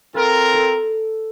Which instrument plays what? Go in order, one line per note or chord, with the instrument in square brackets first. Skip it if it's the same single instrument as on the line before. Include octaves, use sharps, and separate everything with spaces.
[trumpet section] C4 F4 A#4 [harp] A4
[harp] A4